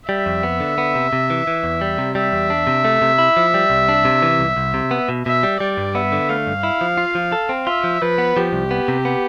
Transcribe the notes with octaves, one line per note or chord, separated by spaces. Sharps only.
G3 E5
F2
B3
D3
B3
C3
C3
E3
E3
E2
G3
C3
G3 E5
E2
D4
C3
A3
C3
E4
F3
G3
C2
D4
C3
E3
C2
C2
C3
B3
B2
B2 E5
G3
G3 D5
G2
B3 E5
D3
A3 F5
G2
E4
F3
F4
F3
A4
C4
F4 E5
F3
F3 B4
B3
F3 G4
C2
B3
C3
B3